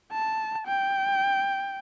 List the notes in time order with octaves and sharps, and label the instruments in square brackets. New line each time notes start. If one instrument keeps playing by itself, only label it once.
[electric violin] A5
G5